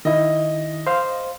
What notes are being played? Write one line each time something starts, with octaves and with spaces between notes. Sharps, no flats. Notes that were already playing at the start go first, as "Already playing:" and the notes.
D#3 E4 D#5
C5 F5